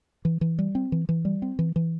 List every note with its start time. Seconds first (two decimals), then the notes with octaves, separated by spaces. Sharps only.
0.25 E3
0.41 E3
0.59 G3
0.75 C4
0.92 E3
1.09 E3
1.25 G3
1.42 C4
1.59 E3
1.76 E3